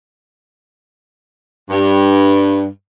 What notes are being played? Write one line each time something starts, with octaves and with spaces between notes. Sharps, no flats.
G2